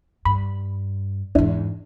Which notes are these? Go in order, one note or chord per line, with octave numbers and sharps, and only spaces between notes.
G2 B5
E2 G#2 D4 E4